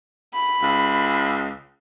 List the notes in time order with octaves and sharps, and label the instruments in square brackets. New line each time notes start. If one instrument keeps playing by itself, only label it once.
[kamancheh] B5
[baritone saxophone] C#2